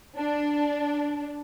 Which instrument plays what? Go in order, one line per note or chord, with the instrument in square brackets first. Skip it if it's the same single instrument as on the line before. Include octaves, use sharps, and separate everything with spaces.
[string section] D4